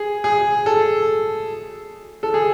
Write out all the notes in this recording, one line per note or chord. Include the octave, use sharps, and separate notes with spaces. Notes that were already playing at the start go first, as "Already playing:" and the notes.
Already playing: G#4
G#4
A4
A4
G#4